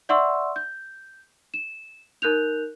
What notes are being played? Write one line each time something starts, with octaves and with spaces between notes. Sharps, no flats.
D5 E5 F#5 C6 C#6 E6
G6
E7
D#4 A#4 F#6 G6 F7